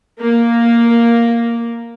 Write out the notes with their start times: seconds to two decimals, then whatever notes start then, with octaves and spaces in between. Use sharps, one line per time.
0.21 A#3